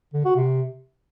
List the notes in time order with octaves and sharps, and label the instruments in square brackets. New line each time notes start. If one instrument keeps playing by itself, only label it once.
[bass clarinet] D3
F#4
C3